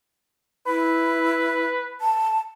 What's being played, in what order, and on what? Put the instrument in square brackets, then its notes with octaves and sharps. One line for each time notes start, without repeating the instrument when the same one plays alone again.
[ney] E4 [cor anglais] B4
[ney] A5